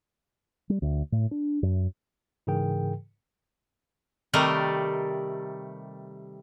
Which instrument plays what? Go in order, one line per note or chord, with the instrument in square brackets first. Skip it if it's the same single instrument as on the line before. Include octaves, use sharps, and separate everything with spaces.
[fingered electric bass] G3
D2
A2
D4
F#2
[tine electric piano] G#2 C#3 E3 G#4 A#4 G5
[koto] C3 D#3 G3 A3 A#4